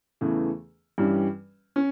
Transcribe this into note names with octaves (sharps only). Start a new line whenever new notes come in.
E2 C#3 E3 A3
G2 E3 G3 C#4
C#4